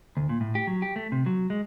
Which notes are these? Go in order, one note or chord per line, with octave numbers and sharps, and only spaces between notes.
D2
A#2
A2
G4
F#3
G4
A3
C3
F#3
G#3